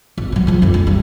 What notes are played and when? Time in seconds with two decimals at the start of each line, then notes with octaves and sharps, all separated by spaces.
0.17 G#1
0.32 C#3 F#3
0.47 C#3 F3
0.62 F2 D#3
0.74 A#3 D4
0.87 G2